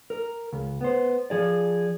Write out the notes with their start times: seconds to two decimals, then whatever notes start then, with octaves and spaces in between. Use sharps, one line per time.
0.10 A#4
0.53 C#2
0.81 B3 C5
1.30 F3 G#4 D5